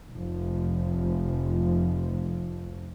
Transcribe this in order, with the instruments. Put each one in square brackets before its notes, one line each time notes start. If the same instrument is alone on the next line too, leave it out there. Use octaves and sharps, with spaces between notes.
[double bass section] F1 F3